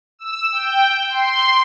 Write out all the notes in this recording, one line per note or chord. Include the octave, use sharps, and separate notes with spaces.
E6
G5
C6